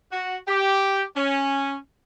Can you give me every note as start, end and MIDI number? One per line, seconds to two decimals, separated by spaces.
0.12 0.37 66
0.47 1.03 67
1.16 1.76 61